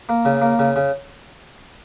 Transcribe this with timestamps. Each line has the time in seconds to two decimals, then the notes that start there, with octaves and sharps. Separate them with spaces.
0.09 A#3
0.25 C#3
0.42 A#3
0.59 C#3
0.76 C#3